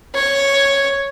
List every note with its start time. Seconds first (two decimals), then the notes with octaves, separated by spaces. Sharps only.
0.14 C#5